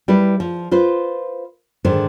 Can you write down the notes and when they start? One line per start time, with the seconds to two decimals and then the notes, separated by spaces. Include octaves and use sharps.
0.08 G3 E4 B4
0.40 F3
0.71 F4 B4 C5
1.85 G#2 D3 D#3 C5